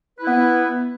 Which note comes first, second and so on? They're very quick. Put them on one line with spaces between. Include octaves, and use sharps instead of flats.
B4 E4 B3